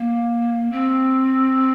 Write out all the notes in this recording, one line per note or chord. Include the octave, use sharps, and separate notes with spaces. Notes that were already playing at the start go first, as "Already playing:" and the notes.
Already playing: A#3
C4